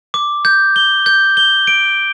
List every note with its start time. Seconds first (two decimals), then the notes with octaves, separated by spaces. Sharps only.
0.14 D6
0.45 G6
0.76 G7
1.06 G6
1.37 G7
1.67 D7